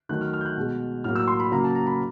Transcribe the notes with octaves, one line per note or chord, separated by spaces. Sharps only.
D#3 F#3 A3 F#6
F6
F6
G6
F#6
B2 G#3
A2 F#3 A#3 F6
E6
C6
B5
C#3 F#3 A#3 A#5
A5
A#5
B5